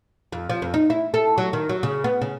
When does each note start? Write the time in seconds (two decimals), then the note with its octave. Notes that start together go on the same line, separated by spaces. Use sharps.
0.32 F2
0.50 F3
0.62 F2
0.74 D#4
0.90 E4
1.14 A4
1.38 F#3
1.53 D#3
1.69 F#3
1.83 C#3
2.04 B3
2.22 C#3